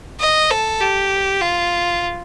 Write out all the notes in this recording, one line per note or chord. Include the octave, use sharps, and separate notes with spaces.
D#5
A4
G4
F4